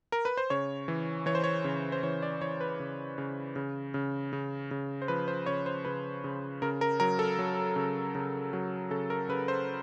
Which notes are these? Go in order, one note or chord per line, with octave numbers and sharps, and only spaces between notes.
A#4
B4
C5
C#3 C#5
E3
E3 C#5
C5
C#5
C#3
C5
E3 C#5
D5
E3 C#5
B4
C#3
C#3
C#3
C#3
C#3
C#3
C5
F3 B4
C5
C#3 C#5
C5
C#3 B4
C#3
C#3 A#4
A#4
F#3 A#4
A4
F#3
C#3
C#3
F#3
C#3 A4
A#4
C#3 B4
C5